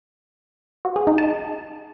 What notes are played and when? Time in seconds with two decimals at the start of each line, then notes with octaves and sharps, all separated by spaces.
0.85 F#4
0.96 G#4
1.07 D#4
1.18 A5